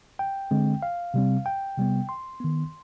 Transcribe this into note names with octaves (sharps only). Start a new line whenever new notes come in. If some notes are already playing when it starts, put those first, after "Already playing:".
G5
D3 G#3 C4
F5
C3 G3 C4
G5
C3 G3 B3
C6
D#3 B3